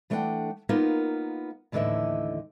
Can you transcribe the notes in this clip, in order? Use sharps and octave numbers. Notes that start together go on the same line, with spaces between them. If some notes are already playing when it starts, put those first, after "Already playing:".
E3 A3 D4 D5 F#5 G5
A#3 B3 D#4 F4 A#4
D#2 A2 D3 E3 D#5 E5